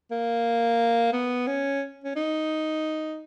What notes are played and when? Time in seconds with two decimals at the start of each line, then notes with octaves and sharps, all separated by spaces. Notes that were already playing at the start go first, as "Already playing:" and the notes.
0.12 A#3
1.13 B3
1.47 C#4
2.04 C#4
2.16 D#4